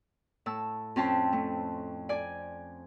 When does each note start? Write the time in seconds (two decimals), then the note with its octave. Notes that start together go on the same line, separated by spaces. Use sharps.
0.46 A2 A5 E6
0.96 F2 C4 C#4 G5 A5 C6
1.33 A3
2.09 D5 G#5